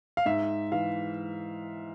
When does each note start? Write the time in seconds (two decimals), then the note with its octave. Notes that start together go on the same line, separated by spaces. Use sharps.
0.17 F5
0.26 G#2 E5
0.72 E3 F5